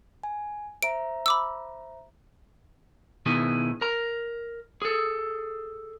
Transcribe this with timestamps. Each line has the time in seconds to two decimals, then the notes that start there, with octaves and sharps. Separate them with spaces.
0.23 G#5
0.82 C5 E5 A#5 D7
1.26 B5 D6 E6
3.26 B2 D#3 B3 E4 G#4
3.81 A#4 A#5
4.82 G#4 A4